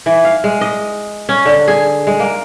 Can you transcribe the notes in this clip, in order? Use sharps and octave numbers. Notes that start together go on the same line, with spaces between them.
E3
F5
G#3
D#5
C#4
D3
G#4
G#3
A#3